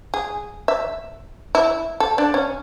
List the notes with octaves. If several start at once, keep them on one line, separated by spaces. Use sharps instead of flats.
G#4
E5
E4
A4
D4
C#4